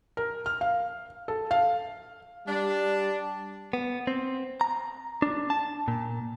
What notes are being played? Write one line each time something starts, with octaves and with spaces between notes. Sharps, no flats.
A#4
F6
F5
A4
F5
G3 D4
B3
C4
A#5
D4
A5
A#2